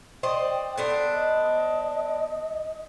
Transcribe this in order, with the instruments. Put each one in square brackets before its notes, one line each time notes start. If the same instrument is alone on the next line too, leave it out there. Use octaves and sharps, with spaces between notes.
[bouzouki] C5 D5 D#5 [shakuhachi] G5
[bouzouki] B3 D4 C5 [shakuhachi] A4
[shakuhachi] D#5